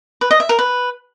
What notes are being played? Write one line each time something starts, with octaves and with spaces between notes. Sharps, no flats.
B4
D#5
E5
A#4
B4